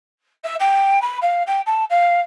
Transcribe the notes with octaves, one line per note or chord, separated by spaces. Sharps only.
E5
G5
B5
F5
G5
A5
F5